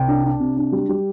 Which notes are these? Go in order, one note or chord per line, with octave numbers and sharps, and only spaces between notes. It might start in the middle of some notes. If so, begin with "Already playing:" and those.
Already playing: C2 G5
D4
D4
C3
D4
G3
G3